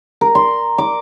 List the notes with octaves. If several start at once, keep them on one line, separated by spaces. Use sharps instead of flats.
A#4
C6
D6